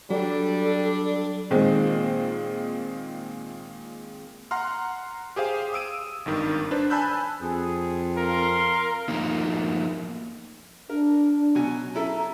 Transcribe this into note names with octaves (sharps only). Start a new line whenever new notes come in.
F#3 G3 D4 A4
A#2 D#3 G#3 C4
F#5 A#5 C6 F6
G4 G#4 C5 F5
D#6 E6 D7 D#7
G#1 G2 D#3
D4 B4 C5
G#5 A5 B5 E6 F#6 G6
F2 G#4
A#4 F5 C6
F3 A3 A#3 D#4
D4 A#4
B2 F#3 G#5
C#4 E4 A4 A#5